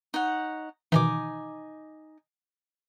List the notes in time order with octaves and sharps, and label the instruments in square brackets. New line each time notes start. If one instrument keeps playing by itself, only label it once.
[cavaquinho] D#4 C#5 F#5
[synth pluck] B2 D#3 E3 [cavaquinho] D#4 G#5 D6